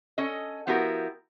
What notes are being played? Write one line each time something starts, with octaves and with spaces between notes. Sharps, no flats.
C#4 A4 D#5
F3 B3 E4 F#4 G4 A#4